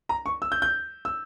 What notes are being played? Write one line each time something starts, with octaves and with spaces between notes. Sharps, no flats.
A#5
C#6
E6
G6
G6
E6